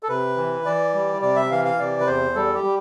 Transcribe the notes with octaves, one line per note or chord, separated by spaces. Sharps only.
A4
C3 B4
E3
E3 D5
G3
C3 D5
E5
E3 F5
F5
C3 D5
B4
E2 C5
G3 A4
G4
G3